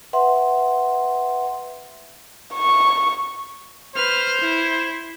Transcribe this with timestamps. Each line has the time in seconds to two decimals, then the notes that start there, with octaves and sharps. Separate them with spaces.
0.13 B4 E5 F#5 C6
2.54 C#6
3.96 B4 C5 F6
4.41 E4